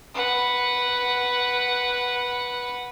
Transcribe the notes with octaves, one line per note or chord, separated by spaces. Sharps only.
B4 F#5